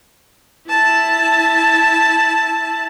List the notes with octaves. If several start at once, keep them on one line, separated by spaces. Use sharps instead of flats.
E4 A5